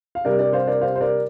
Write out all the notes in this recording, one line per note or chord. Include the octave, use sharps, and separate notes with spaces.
F5
C3 G3 D4 A#4 D5
A#4 D5
C5 F5
A#4 D5
C5 F5
C5
A#4 D5